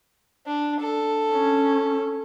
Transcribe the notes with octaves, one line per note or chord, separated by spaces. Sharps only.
D4
A4
C#4